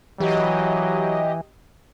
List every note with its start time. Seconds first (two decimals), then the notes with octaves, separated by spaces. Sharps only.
0.20 E3 F#3 G4 D#5